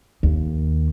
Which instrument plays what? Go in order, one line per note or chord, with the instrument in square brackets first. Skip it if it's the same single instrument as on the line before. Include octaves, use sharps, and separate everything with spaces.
[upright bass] D#2